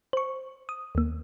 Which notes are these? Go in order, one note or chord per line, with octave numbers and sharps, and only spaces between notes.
C5 C#6
D#6
D#2 A#3